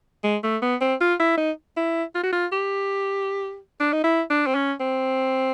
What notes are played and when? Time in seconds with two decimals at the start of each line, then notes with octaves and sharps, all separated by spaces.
0.24 G#3
0.44 A3
0.62 B3
0.81 C4
1.01 F4
1.20 E4
1.38 D#4
1.77 E4
2.15 F4
2.23 F#4
2.32 F4
2.52 G4
3.80 D4
3.93 D#4
4.04 E4
4.30 D4
4.47 C4
4.55 C#4
4.80 C4